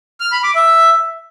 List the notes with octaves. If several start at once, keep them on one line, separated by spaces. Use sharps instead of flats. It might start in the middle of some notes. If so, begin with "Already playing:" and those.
F6
B5
D6
E5